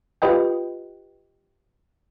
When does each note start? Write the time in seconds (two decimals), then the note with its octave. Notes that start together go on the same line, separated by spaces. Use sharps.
0.22 F4 G4 B4 D#5 G5